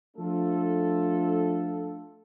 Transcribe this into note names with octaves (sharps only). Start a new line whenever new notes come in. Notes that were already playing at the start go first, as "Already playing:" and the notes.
F3 A3 D4 F4 A4